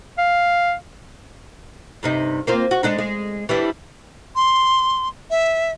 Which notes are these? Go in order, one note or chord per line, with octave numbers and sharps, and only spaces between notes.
F5
G2 C3 D#4
A#3 C4 F4
F#4
G#3 D4 D#4
G#3
E3 G3 D4
C6
E5